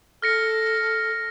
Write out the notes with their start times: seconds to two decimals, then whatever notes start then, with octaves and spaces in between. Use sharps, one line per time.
0.22 A4 F6 A#6 C#7